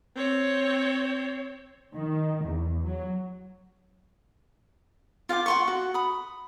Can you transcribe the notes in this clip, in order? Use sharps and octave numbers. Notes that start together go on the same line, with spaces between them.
C4 C#5
D#3
E2
F#3
F4 F5 G5 D6
F#5 C6 C#6
F#4
B5 D#6